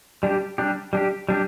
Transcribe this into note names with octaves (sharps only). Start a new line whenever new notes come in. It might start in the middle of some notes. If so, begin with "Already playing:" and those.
G3 D4 G4
G3 D4 G4
G3 D4 G4
G3 D4 G4